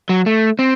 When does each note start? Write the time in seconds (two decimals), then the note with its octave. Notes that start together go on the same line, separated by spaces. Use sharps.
0.09 F#3
0.26 A3
0.59 C4